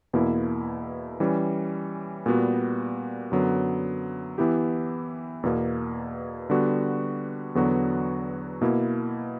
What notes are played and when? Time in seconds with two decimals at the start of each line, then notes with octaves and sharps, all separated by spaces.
0.13 E2 B2 A#3 E4
1.20 E3 G3 C#4
2.26 A#2 G3 B3 F#4
3.32 F#2 D3 F#3 B3
4.38 E3 B3 E4 G4
5.43 E2 B2 A#3
6.50 D3 G3 B3 F#4
7.55 E2 D3 F#3 B3 F#4
8.61 B2 A#3 E4